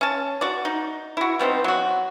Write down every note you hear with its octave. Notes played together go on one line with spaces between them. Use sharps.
C#4 A5
F#4 D5
D#4
E4 F#4
G3 B3 C4 D#4
F#3 F#4